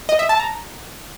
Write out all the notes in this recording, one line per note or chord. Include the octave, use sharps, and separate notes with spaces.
D#5
E5
A5
A#5